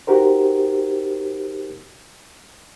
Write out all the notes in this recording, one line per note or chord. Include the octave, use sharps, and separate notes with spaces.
D#4 F#4 G4 A#4 C5